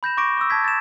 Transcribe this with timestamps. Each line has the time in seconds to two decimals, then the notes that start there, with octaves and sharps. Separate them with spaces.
0.03 B5 G6 A#6 E7
0.17 C#6 D6 A#6 D7
0.37 C#6 D#6 E6
0.50 A5 E6 G#6 B6
0.64 A6 E7